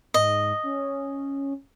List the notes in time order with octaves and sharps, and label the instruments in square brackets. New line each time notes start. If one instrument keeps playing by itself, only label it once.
[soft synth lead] G#2 [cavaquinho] D#5
[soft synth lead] C#4